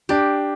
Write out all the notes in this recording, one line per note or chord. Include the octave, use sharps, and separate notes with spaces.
D4 G4